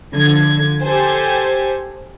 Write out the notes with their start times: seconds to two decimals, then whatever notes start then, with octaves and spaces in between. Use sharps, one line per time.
0.13 D3 F3 G#6
0.82 G4 A4 C5 G#5